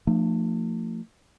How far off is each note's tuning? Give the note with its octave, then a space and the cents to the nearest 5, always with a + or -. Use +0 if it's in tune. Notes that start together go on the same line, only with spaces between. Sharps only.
F3 +0 A3 +40 D4 +45